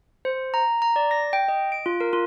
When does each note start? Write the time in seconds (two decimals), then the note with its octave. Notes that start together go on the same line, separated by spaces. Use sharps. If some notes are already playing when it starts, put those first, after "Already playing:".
0.25 C5
0.54 A#5
0.82 A#5
0.96 D5
1.11 A#6
1.33 G5
1.48 D#5
1.72 D7
1.86 F4
2.01 A#4
2.13 F4